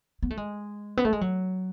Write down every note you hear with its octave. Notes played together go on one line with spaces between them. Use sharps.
B3
A3
G#3
B3
A3
G#3
F#3